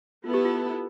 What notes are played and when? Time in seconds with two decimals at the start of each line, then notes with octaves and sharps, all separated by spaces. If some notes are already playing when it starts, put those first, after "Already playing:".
0.24 B3 E4 F4 A4
0.34 G4
0.45 F4